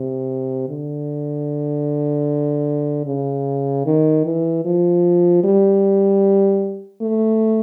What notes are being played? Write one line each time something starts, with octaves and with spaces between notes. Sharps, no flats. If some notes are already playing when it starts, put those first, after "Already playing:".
Already playing: C3
D3
C#3
D#3
E3
F3
G3
A3